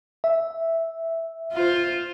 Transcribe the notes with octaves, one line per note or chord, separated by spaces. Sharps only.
E5
F4 C5